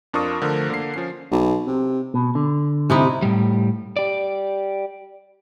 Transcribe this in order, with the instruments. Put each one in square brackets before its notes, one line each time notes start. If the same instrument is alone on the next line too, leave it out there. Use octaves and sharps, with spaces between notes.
[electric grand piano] F2 D4 F4 A#4 C#6 D#6
D3 F3 A3 A#4
D3 A#3 C7
F3 C#4 C7
[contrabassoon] B1
C3
[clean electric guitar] B2
D3
[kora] C3 D#4 E4
[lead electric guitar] A2 G3
G4 D5